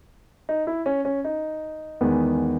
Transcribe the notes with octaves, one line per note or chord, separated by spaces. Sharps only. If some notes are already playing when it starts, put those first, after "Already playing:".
D#4
E4
C#4
C#4
D#4
E2 D#3 G#3 B3